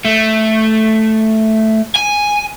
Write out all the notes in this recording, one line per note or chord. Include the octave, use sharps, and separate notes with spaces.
A3
G#5